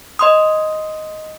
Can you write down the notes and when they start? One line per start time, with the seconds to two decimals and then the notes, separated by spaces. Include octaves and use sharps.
0.19 D#5 C6 D#6